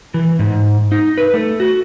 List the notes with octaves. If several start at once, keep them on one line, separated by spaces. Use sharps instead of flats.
E3
G#2
D#4
B4
A3
F#4